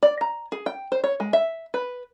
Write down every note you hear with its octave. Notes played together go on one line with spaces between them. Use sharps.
D5
A#5
G#4
G5
C5
C#5
G#3
E5
B4